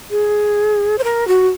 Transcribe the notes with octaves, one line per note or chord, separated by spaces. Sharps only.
G#4
C5
A#4
F#4